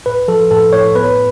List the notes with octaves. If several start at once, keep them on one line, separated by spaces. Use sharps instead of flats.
A2 B4
F3 A4
A2 A4
A2 C#5
B3 B4